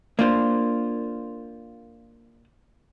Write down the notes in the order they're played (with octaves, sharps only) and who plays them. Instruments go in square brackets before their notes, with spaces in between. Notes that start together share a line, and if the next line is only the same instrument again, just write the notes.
[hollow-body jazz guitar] A#3 D4 F4 C5